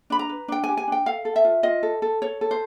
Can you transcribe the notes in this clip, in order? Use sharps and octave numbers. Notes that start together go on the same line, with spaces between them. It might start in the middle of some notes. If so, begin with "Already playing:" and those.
D4 B5
A#5
B4
D4 G5
G4 G#5
G#5
D4 G5
A4 F5
A4
E5
F4
F4 D#5
A4
A4
A4 C#5
A4
C5